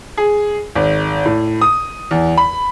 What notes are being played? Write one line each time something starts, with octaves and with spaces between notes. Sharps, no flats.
G#4
G#1
A2
D#6
E2
B5